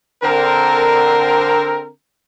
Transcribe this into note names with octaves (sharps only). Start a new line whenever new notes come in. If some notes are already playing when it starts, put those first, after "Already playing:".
D3 C4 A#4